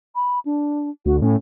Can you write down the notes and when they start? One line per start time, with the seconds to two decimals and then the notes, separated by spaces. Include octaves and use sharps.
0.15 B5
0.45 D4
1.06 D2 F#4
1.22 A2 C#4